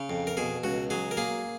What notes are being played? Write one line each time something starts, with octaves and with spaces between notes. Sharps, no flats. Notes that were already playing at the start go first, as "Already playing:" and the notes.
Already playing: C#3
F2
A#4
B2 G#4
C#2 F#4
F#3 G#4
A#4
A#3 G#4